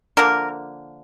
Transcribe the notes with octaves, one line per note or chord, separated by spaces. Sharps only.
D3 F3 A#3 A#4